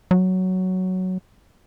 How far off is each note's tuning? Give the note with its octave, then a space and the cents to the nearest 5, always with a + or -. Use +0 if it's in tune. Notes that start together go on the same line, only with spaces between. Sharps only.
F#3 +5